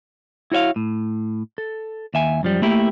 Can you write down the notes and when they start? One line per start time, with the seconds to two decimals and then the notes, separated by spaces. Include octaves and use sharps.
0.52 E4 F#4 C#5 E5 F5
0.76 A2
1.58 A4
2.14 D#2 E5 G#5
2.43 F#2 F3 G3
2.62 A3 A#3 E4 G4 A#4